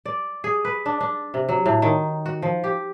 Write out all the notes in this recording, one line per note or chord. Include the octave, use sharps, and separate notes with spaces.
D5
G#4
B4
D4
D4
C3
F#3
A2
D#3
F#4
F3
G4